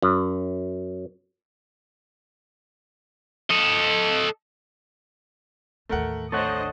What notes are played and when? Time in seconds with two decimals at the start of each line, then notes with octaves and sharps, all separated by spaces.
0.02 F#2
3.51 A4 D#5
5.89 A1 D#2 A3 A#4 F#5
6.32 A3 D4 A4 C5 C#5 D#5 F#5